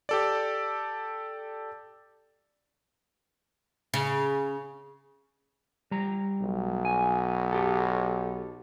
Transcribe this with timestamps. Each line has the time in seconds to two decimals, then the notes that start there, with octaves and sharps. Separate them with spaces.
0.09 G4 A4 D5
3.94 C#3
5.91 G3 A#5
6.41 B1
6.85 G#5
7.52 G4 A4